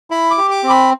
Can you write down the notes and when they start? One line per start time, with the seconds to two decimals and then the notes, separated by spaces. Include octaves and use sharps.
0.10 E4 B5
0.31 D6
0.38 G4
0.51 D6
0.64 C4
0.70 B5